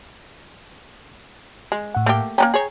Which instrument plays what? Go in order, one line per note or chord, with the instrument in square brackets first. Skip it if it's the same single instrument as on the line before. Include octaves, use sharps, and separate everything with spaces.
[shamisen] G#3
[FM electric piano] A2 F#5
[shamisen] A3 A#3 G4
[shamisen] A#3 B3 C#4 [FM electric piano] G5 A#5
[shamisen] G#4 C#5